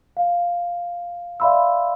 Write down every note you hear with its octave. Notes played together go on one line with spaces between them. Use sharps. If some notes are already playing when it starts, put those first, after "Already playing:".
F5
D5 E5 F5 B5 C6 E6